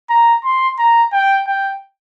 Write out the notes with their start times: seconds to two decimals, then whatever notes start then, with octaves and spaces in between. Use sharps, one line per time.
0.10 A#5
0.44 C6
0.79 A#5
1.13 G5
1.47 G5